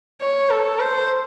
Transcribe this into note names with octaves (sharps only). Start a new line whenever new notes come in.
C#5
A4
C5